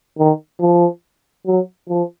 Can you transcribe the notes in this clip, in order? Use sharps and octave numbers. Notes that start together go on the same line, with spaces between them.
D#3
F3
F#3
F3